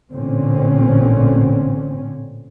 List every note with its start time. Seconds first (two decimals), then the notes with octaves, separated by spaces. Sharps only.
0.11 A1 A#2 D3 C4 C#4